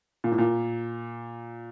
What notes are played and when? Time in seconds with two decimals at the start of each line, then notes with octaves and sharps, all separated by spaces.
0.24 A#2
0.32 A2
0.38 A#2